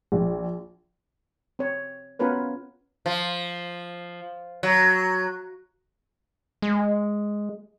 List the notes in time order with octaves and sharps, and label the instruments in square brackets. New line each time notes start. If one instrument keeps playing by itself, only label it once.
[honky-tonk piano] A#1
[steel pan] C4 C#5
B3 C#4 F4 A#4 B4 C#5
[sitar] F3
F#3
[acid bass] G#3